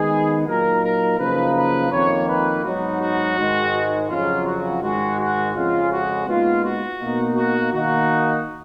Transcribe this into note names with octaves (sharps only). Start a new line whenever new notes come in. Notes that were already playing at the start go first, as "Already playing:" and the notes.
Already playing: D#3 G#3 B3 G#4
A#2 F#3 A#3 D#4 A#4
A#4
F#2 C#3 F3 A#3 D#4 B4
B4
F2 D#3 A#3 C#5
B4
G#2 F#3 B3 D#4 F#4
F#4
G#2 D#3 G#3
F2 C#3 F#3 F4
F#4
G#2 D#3 G#3 F#4
F#4
F2 C#3 G#3 F4
F#4
A#2 G#3 B3 D#4 F4
F#4
B2 A#3 D#4
F#4
D#3 A#3 D#4 F#4